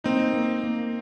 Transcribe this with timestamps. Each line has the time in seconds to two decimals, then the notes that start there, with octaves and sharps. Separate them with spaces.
0.04 A#3 C4 D#4
0.34 A#3
0.63 A#3